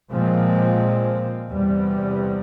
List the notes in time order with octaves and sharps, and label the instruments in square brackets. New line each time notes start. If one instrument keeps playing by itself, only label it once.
[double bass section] A#2 F3 G#3 C4
E2 C3 G3